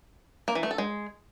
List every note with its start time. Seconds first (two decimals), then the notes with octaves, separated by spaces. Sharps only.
0.48 A#3
0.55 E3
0.63 A3
0.71 A4
0.78 G#3